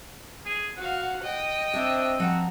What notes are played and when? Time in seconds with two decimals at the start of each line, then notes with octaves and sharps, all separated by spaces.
0.46 G#4
0.78 F#4 F5 F#5
1.22 D#5 G5
1.74 C4 D4 C5 E5
2.20 F3 F#4 F#5 A#5